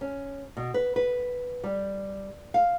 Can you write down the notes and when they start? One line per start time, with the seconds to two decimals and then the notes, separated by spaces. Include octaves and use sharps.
0.01 C#4
0.57 B2
0.74 B4
0.96 B4
1.64 G3
2.54 F5